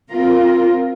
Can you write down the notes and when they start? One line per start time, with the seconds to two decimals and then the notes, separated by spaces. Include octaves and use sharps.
0.11 C4 F4 A#4